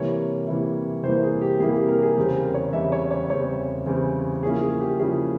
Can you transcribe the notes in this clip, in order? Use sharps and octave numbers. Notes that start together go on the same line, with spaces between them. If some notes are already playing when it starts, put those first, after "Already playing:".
Already playing: C3 E3 G3 A#3 E4 C#5
C3 E3 G3 A#3 E4
C3 E3 G3 A#3 E4 C5
G#4
G4
C3 E3 G3 A#3 E4 G#4
G4
A#4
G#4
E2 C#3 G3 C4 G4
A#4
C#5
E2 C#3 G3 C4 E5
C#5
C#5
E2 C#3 G3 C4 C#5
E2 C#3 G3 C4
C#3 F3 A#3 C#4 E4 G#4
G#4
G4
C#3 F3 A#3 C#4 E4 G#4